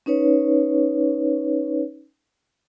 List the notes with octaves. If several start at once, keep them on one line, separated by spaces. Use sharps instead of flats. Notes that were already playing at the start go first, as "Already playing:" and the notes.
C#4 D#4 B4 C#5